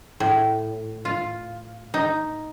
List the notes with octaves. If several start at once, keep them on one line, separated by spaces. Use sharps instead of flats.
A2
F4
D#4